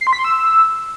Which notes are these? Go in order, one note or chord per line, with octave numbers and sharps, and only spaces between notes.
C7
C6
B6
C6
E6